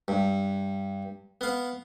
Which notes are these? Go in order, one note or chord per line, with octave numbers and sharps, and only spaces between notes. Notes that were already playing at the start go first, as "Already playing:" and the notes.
G2
B3 F5